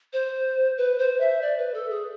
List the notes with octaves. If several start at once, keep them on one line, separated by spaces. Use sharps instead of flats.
C5
B4
C5
E5
D5
B4
A4
G#4